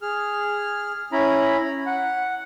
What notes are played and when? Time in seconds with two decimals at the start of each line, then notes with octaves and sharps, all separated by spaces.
0.02 G#4 F6
1.12 C#4 E4 A#5 B5
1.86 F#5